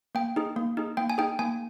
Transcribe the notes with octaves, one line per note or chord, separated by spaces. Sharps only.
A#3 G5
D#4 G#4
A#3
D#4 G#4
A#3 G5
G#5
D#4 G#4 G5
A#3 G#5